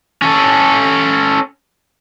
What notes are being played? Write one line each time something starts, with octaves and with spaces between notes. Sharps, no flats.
C#4 A4